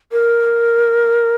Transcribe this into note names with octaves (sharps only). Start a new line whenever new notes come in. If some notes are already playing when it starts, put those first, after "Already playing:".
A#4